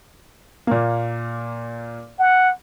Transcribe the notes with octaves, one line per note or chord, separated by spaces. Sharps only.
A#2 A#3
F#5